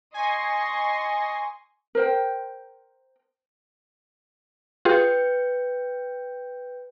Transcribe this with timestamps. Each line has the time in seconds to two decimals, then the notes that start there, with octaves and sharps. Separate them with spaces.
0.14 D#5 G#5 C6 C#6
1.95 A#4 C5 G5
4.85 F4 G#4 B4 G5 G6